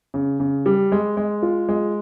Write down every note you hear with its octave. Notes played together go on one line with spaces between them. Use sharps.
C#3
C#3
G3
G#3
G#3
F4
G#3